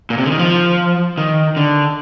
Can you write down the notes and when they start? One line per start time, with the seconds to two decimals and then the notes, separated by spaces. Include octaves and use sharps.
0.10 A#2
0.17 C3
0.24 D3
0.31 D#3
0.39 F3
1.18 D#3
1.57 D3